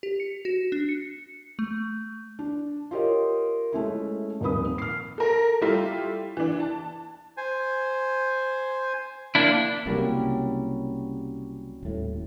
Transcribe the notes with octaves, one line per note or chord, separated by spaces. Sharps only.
G4
C#7
F#4
D4
C#7
A3
D4
F4 G4 A#4 C#5 D#5
G#3 A3 C#4 E4
D#1 F2 D#4 B4 B5 D#6
F6 C7
A4 A#4
G3 A3 E4 F4
E3 D4
A5
C5 G#5
A#3 D4 E4 G5
C2 C#3 F#3 G3 A#3 C#4
D#1 A2